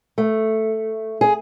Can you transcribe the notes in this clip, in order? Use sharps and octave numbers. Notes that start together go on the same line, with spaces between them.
A3
G#4